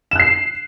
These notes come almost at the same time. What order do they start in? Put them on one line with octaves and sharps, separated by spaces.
E7 F#6 C7